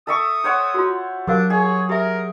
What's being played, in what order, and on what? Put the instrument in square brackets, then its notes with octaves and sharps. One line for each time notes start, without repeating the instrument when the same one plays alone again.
[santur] A4 E5 C#6 [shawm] D#6
[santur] C5 C#5 F#5
[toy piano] F4 F#4
[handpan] F#3 [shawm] D4 [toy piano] G4 A#4 F5
[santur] G#4 [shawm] C#5
[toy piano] G4 E5 [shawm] A#4